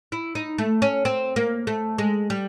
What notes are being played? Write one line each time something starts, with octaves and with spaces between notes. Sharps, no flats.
E4
D#4
A3
C#4
C4
A#3
A3
G#3
G3